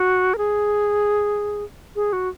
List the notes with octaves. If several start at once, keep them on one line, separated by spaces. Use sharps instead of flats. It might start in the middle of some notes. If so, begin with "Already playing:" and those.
Already playing: F#4
A#4
G#4
G#4
F#4